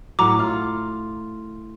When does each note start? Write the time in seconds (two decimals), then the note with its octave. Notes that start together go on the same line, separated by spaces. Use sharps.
0.19 A2 F#3 A#5 D6
0.39 F4